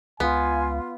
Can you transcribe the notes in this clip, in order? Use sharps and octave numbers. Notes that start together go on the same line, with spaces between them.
C#2 B3 F4 G#5